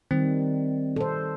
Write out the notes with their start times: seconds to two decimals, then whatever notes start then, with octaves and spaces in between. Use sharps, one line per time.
0.11 D#3 G3 C4
0.96 A4 C5